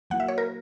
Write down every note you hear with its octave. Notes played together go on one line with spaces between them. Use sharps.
F#3 A#3 E4 F#5
E5
C#5
A#4